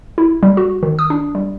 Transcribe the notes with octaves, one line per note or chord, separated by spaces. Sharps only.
E4
G3
F#4
D#3
D#6
D4
G3